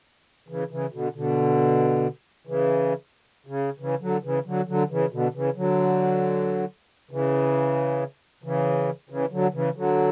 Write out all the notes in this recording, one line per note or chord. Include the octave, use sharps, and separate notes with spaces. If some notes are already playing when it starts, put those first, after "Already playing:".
C#3 E3
C#3 E3
B2 D3
B2 D3
C#3 E3
C#3
C#3 E3
D3 F#3
C#3 E3
D3 F#3
D3 F#3
C#3 E3
B2 D3
C#3 E3
D3 F#3
C#3 E3
C#3 E3
C#3 E3
D3 F#3
C#3 E3
D3 F#3